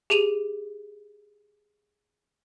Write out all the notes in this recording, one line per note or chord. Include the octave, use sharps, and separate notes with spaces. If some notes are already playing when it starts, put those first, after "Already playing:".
G4 G#4 D#7 F7